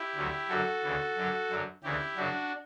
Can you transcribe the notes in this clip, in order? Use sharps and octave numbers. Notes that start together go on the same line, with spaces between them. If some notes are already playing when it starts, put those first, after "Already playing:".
Already playing: E4 G4
D2 D3 F#3
F#2 D3 F#3 F#4 A4
D2 C#3 E3
F#2 D3 F#3
F#2 D3 F#3
D2 C#3 E3 E4 G4
F#2 C#3 F#3 D4 F#4